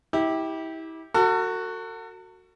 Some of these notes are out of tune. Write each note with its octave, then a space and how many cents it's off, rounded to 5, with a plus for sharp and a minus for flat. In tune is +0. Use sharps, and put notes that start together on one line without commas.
E4 -30 G4 +0
F#4 +0 A4 +45